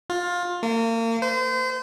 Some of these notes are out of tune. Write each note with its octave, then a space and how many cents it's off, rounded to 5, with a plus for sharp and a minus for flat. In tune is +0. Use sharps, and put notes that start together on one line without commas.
F4 +20
A#3 -35
C5 -35